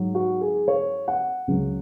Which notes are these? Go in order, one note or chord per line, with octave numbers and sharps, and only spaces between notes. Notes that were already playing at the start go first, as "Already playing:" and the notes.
Already playing: G#2 F#3
F#4
G#4
C#5
F#5
C#2 C#3 F#3